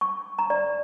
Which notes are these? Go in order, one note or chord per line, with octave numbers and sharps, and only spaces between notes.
C#6
A#5
D5